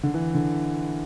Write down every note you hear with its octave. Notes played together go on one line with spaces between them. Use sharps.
D3
E3
D3